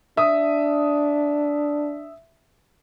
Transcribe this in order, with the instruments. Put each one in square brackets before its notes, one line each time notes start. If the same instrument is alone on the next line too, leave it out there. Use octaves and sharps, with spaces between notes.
[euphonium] D4 [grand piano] E5 D#6